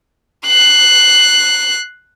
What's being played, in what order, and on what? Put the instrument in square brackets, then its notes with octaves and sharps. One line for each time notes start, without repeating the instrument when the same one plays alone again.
[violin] F#6 C7